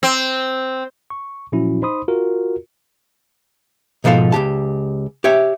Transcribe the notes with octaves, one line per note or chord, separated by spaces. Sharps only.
C4
C#6
A#2 F3 F#3 C#4 E4 F#4
D#4 C5 B5 C6 D#6
F4 F#4 A#4
G#2 B2 F3 A4 F5
C#2 A#2 G4 A5
G4 C#5 E5